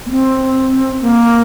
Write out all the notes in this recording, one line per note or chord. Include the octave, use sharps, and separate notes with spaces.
A#3
C4
A#3